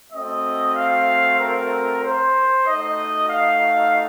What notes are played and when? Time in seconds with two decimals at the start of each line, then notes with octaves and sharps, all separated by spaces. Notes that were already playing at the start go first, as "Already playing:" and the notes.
0.12 A3 C4 F#4 D#5
0.75 F5
1.38 A#4
2.02 C5
2.65 A3 D#4 F#4 D#5
3.29 F5